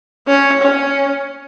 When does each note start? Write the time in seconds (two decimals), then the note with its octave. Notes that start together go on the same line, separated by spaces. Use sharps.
0.27 C#4
0.61 C#4